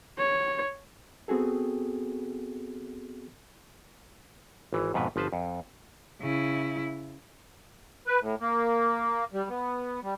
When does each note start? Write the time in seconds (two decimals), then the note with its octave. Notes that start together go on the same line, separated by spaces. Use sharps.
0.18 C#5
1.28 B3 C4 F#4 G#4 A4
4.73 G#1 E3
4.94 F2 G#2 B2 B4
5.16 G1 F3 B4 C5 A5
5.33 F2
6.20 C#3 E4
8.07 B4
8.21 A2
8.41 A#3
9.33 G3
9.49 B3
10.03 G3